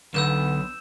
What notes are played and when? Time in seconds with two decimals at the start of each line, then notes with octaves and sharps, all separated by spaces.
0.14 B1 D3 B3 E6 G6 E7